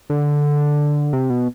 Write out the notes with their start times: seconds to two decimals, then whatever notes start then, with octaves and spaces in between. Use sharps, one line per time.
0.10 D3
1.13 C3
1.30 B2